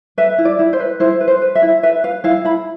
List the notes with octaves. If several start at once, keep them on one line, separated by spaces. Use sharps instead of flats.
B4 E5
E4
D5
E4
C5
B4
E4 C5
B4
C5
B4
E5
E4
B4 E5
B4 F5
E4 F5
E4 B5